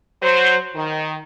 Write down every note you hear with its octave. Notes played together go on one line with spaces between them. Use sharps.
F#3 C5
D#3